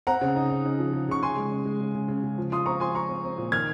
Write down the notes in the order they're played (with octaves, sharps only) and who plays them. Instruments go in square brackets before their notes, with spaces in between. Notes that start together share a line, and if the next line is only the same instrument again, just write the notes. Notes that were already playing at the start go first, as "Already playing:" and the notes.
[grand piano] C4 F#5 A#5
C#3
D#4
D#4
C#3
F3
C#3
C#3 C#6
C#3 G#5 C6
G#3
C#3
G#3
C#3
C#3
C#3
C#3
F3
F4 C6 D#6
C4 A#5 C#6
F3 G#5 C6
F4 A#5 C#6
C4
C4
A#2
D#3 F6 G#6